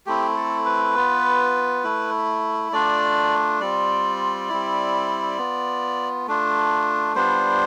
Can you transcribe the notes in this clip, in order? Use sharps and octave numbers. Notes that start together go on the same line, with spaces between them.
A3 C4 E4 G4
A4
B4
B3 F4
A3 E4
A3 D4 F4 D5
G3 C4 F4 D5
G3 C4 E4
B3 F4
A3 D4 F4
G3 B3 D4 F4 C5